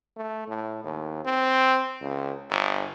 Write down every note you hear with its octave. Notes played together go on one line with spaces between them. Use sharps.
A3
A2
D#2
C4
C#2
G1